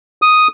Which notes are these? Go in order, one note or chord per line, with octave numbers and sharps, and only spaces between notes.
D#6